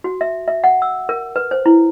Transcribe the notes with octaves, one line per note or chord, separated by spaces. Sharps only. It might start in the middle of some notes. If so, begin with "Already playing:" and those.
F#4
E5
E5
F#5
E6
A#4
B4
C5
E4